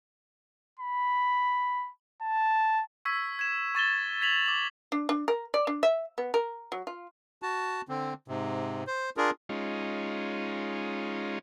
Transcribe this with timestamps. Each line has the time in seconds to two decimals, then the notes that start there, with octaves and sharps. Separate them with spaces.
0.79 B5
2.22 A5
3.05 C#6 E6 G#6 B6
3.39 G#6 E7
3.75 C#6 A6 E7 G7
4.21 G#6 B6 F7 F#7
4.46 D6 F#7
4.92 D4
5.09 D4
5.28 A#4
5.54 D5
5.67 D4
5.83 E5
6.18 B3
6.34 A#4
6.72 F#3
6.87 F4
7.42 F#4 A5
7.89 D3 C4
8.28 G#2 C3
8.87 C5
9.17 D4 F4 G#4 A#4
9.49 G#3 C#4 D#4 F4